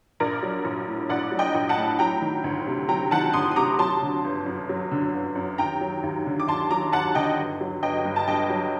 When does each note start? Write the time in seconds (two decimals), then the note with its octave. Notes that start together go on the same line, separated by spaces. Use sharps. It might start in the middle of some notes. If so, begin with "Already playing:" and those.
0.20 A#1 A#4 D5
0.43 F#3
0.65 A#1
0.88 A2
1.09 A#1 D5 F#5
1.31 F#3
1.39 D#5 G5
1.55 A#1
1.69 F#5 A5
1.77 A2
1.99 F#3 G5 A#5
2.22 D#3
2.44 D2
2.67 C3
2.89 F#3 G5 A#5
3.11 D#3 F#5 A5
3.33 D2 C6 D#6
3.51 D#6
3.56 C3 A#5 D6
3.79 F#3 A5 C6
4.02 D3
4.24 G1
4.46 F#2
4.69 F#3
4.91 D3
5.14 G1
5.35 F#2
5.58 D#2 G5 A#5
5.81 F#3
6.03 D#2
6.26 D3
6.40 D6
6.48 D#2 A5 C6
6.71 F#3 A#5 D6
6.93 D#2 F#5 A5
7.15 D3 D#5 G5
7.37 G1
7.61 F#3
7.82 G1 D#5 G5
8.05 G2
8.16 A5
8.27 G1 D#5 G5
8.50 F#3